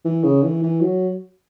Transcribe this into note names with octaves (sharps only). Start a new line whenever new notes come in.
E3
C#3
E3
E3
F#3